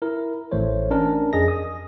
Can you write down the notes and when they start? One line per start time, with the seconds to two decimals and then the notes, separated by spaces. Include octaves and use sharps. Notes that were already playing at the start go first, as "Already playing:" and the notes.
0.02 E4 A#4
0.51 A1 E3 A3 C5 C#5
0.91 C#4 D4 A#4
1.33 F2 G#4 D#5 A#6
1.48 D#6